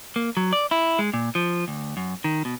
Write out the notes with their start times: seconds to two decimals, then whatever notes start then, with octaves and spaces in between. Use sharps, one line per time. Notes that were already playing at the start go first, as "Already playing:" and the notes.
0.16 A#3
0.37 F#3
0.53 D5
0.71 E4
0.99 G#3
1.14 A#2
1.35 F3
1.68 D2
1.97 F#2
2.24 D#3
2.45 B2